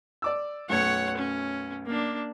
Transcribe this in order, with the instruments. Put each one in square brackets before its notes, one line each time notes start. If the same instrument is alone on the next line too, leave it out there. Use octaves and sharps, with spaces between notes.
[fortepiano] D5 D6 E6
[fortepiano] B1 F#2 A3 [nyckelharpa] C#5 F#5
[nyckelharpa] C#4
A#3 D4